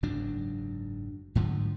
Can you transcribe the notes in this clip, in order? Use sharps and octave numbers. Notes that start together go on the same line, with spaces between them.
F#1 G#2 F#3 D4
G#2 D3 F3 F#3